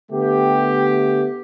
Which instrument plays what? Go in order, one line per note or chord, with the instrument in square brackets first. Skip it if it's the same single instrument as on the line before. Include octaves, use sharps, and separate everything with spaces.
[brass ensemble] D3 A3 B3 G4